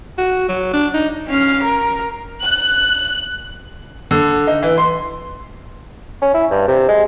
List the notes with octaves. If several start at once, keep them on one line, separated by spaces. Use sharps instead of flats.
F#4
F#3
D4
D#4
C#4 F5
A#4
F#6
D3
D#4
E3
C6
C#4
E4
G2
C3
G#3